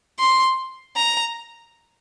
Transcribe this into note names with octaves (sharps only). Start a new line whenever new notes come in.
C6
A#5